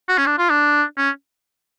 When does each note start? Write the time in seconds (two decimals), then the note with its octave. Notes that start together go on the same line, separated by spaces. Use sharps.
0.09 F#4
0.18 C#4
0.26 D4
0.38 F4
0.50 D4
0.97 C#4